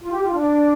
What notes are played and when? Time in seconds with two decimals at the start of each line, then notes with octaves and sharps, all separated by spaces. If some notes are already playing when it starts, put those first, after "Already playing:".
0.02 F4
0.12 G4
0.24 F4
0.34 D4